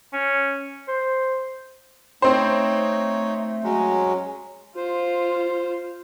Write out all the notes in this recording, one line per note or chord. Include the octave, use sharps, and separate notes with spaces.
C#4
C5
A3 C4 D#4 C5 C#5
F#3 G#3 C#4
F4 C5